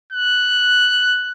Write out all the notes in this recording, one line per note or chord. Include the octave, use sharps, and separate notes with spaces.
F#6